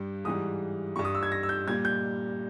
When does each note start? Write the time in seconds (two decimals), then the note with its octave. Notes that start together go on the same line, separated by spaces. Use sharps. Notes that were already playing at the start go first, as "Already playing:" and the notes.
Already playing: G2 G3
0.25 G#2 E3 G3 D#6
0.96 G2 G3 C#6
1.05 D#6
1.15 E6
1.23 G#6
1.32 A#6
1.43 E6
1.49 G6
1.67 A#2 G3 G#6
1.85 G6